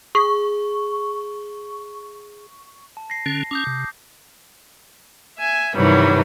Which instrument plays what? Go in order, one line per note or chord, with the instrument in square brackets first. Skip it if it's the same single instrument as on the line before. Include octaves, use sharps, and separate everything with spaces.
[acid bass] G#4 [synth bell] C#6
[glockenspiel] A5
A#6 C7
[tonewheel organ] D3 C#4
[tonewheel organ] C#4 [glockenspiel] D6 D#6 G6
[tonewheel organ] C3
[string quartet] E5 G#5
G2 C3 D#3 E3 F#3 G3